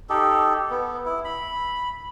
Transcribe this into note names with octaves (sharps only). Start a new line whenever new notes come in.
D#4 G4 A4
B3
E4
B5